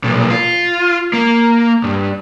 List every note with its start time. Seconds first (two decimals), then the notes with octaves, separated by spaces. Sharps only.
0.04 B1 A#2
0.30 F4
1.13 A#3
1.84 G2